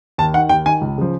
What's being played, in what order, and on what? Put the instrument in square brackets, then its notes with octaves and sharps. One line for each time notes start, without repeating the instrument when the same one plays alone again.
[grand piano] D#2 A5
D#3 F#5
D#2 G5
D#3 G#5
C#2
C#3 F3